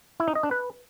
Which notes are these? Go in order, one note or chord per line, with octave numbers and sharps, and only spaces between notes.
E4
D#4
D#5
D4
B4